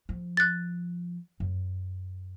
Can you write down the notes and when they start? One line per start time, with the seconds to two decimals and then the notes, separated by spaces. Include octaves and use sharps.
0.09 F3
0.37 F#6 A6
1.40 F#2